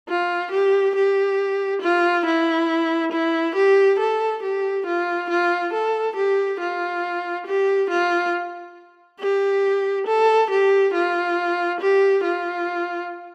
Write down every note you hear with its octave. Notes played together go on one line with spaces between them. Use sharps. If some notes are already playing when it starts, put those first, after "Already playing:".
F4
G4
G4
F4
E4
E4
G4
A4
G4
F4
F4
A4
G4
F4
G4
F4
G4
A4
G4
F4
G4
F4